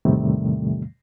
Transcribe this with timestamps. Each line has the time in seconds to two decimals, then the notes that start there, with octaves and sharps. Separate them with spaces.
0.05 E2 A2 C3 D#3 G3 A3